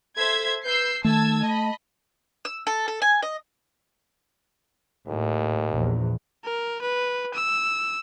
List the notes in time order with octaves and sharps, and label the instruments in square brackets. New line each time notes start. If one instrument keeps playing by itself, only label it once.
[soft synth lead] A4 [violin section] C5 E5 G#6
[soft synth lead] B4 [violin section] E6 G6 C7
[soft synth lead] D#3 [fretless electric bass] A3 [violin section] A5 E6 G#6
[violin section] D#5 B5 [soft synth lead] A5
[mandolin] E6
A4
A4
G#5
D#5
[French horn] D#2 [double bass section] A2
[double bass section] A#1 E2
[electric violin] A#4
B4
E6